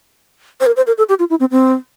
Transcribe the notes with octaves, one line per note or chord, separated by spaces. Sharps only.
C5
A#4
C5
A#4
A4
G4
F4
E4
C4
C4